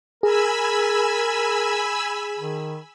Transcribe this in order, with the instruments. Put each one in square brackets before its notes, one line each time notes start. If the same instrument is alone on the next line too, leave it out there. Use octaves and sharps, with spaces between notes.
[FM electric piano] G#4 [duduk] A#4 [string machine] G#5 B5 E6
[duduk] D#3